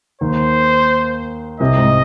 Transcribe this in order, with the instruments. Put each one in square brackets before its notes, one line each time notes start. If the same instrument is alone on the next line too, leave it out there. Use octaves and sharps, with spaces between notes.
[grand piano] D#2 D#3 [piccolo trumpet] C5
[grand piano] C2 C3 [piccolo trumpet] D#5
[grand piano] G#2